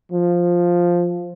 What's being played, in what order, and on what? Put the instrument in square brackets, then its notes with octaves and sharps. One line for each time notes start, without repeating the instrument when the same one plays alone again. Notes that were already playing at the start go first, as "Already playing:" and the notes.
[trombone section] F3